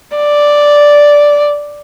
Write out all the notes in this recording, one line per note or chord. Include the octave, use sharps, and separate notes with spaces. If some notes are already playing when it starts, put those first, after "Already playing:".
D5